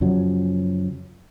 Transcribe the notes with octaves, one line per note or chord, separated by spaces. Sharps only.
F#2 C#3 F3 F#3